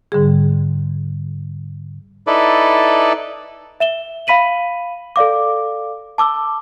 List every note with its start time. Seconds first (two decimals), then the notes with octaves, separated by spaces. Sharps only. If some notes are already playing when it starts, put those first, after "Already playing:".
0.12 G#2 D3 G3 G#4
2.27 D#4 E4 A4 B4 D5
3.80 E5 E7 G7
4.27 F5 B5 B6 D#7 F#7
5.16 A4 D5 F5 D6
6.18 A5 D6 E6 G7